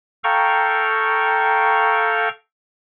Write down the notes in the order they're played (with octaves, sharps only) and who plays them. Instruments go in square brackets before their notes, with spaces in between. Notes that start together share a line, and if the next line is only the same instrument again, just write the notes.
[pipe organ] A4 F5 G5 A#5 C#6